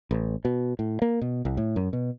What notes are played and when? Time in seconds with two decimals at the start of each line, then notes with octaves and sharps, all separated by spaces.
0.11 A1
0.45 B2
0.79 A2
1.02 A#3
1.21 B2
1.45 C2
1.57 A2
1.76 F#2
1.93 B2